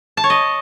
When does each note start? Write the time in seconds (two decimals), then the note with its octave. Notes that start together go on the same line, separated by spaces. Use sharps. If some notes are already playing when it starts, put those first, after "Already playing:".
0.17 A5
0.24 C#5
0.30 D#5